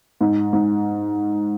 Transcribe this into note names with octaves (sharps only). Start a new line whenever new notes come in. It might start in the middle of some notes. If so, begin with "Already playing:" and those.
G#2
G#2